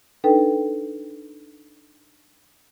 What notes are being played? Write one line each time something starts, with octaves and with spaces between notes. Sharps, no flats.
D4 D#4 A4 B4 G5